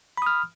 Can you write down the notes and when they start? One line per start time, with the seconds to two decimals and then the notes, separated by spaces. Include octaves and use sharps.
0.17 B5
0.22 D#6
0.27 F6